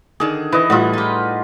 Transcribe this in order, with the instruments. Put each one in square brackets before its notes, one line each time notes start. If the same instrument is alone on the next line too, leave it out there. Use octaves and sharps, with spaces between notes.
[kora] D3 D#3 D4 [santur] G#4
[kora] E3 [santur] B4 D#5
[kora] A2 G3 [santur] F4 D#5 F#5
[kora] D#4 G4